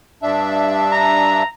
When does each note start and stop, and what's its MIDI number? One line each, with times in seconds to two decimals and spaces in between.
0.22 1.43 43
0.22 1.43 62
0.22 1.43 76
0.93 1.48 82